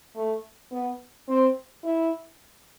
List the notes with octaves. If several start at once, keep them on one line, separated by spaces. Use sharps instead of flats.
A3
B3
C4
E4